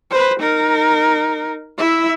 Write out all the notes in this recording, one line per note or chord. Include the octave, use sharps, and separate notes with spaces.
B4 C5
D#4 A#4
E4 E5